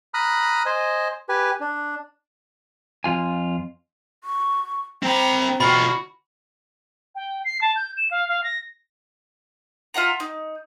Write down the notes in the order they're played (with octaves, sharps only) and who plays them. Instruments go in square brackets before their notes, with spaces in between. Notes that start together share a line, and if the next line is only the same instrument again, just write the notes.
[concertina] A#5 B5 D#6 F6 F#6
C5 D#5 G#5
G4 B4 G#5
D4
[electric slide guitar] F2 F4 G#5
[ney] C#6
[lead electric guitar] C4 B5 [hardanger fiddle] C5 A#5 [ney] G5
[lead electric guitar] B2 F4 [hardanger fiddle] F#4 [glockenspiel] B5
[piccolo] G5
C7
A5
G6
E7
F5
F5
A#6
[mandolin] F4 E5 F#5 A#5
D#4